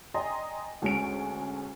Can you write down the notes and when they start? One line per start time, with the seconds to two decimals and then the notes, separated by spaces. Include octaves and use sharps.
0.14 D5 D#5 G5 G#5 A#5 C6
0.82 D2 G#3 C#4 G#5 D7